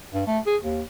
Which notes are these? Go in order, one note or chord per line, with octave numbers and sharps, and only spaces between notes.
G2
A3
G#4
D#2